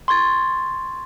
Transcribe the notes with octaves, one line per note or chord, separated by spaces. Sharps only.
C6 C#6 G#6 A6